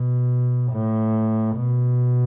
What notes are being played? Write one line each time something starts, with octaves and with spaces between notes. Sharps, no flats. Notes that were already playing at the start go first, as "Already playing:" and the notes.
Already playing: B2
A2
B2